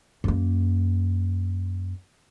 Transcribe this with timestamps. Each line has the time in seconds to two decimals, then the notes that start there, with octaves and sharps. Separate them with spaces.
0.24 F#2 A#3